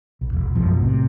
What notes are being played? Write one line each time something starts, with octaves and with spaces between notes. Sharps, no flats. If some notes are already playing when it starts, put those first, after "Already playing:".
B1
E1
B1 F#2 B2 F3
A2 C3